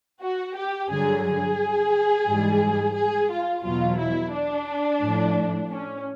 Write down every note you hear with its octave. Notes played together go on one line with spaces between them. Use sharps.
F#4
G4
G2 D3 F#3 G#4
G#4
G#2 E3 G3
G#4
F4
E2 B2 F#3 F4
E4
D4
A2 F3
C#4